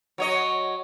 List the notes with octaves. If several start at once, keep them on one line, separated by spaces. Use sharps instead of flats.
F#3 C#5 D#5